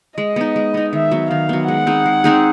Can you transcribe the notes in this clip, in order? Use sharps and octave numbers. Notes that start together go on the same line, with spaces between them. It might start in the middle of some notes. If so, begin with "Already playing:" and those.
G#3 D#5
B3 D#4
G#3
B3 D#4
D#3 E5
F#3 B3
D#3 F5
F#3 B3
G#3 F#5
C4 D#4 G#4
G#3
C4 D#4 G#4